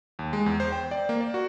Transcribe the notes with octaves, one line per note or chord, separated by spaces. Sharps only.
D#2
G#3
E2
C5
G5
D5
A#3
D5
F#4